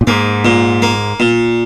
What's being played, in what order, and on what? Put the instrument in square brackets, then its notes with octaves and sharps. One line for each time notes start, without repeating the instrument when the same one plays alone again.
[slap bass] A#2
[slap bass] G#2 [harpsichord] A#3
[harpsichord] A#2
A#3
A#2